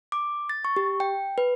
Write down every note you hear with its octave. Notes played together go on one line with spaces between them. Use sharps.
D6
A6
C#6
G4
G5
B4